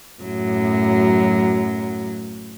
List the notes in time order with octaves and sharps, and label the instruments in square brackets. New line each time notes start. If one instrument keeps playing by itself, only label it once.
[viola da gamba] F#2 A2 F#3